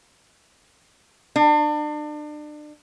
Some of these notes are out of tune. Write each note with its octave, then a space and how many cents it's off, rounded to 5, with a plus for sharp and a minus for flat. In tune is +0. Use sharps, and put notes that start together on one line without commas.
D4 +35